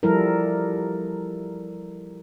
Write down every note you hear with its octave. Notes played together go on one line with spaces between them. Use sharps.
F3 G3 E4 A4 A#4